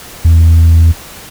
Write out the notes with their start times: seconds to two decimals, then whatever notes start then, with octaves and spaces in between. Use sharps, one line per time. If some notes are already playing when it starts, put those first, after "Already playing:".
0.25 E2